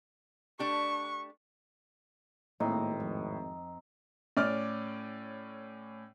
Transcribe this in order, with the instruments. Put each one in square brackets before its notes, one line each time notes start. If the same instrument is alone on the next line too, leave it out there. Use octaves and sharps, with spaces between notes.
[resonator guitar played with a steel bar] A3 D4 G4 [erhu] C#6
[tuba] G#1 [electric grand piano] A2 [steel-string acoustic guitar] A#3 [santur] C4 D#4
[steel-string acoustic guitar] F2
[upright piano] A2 C#4 D5 D6 F6